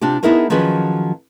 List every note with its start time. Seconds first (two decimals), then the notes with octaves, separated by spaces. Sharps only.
0.01 C3 D4 F4 G4
0.23 B3 D#4 E4 G#4 A#4 C5
0.50 D#3 F3 F#3 C#4 G#4 B4